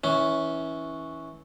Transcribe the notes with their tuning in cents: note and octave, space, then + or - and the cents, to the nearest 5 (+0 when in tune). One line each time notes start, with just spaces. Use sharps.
E3 -20 C#4 +0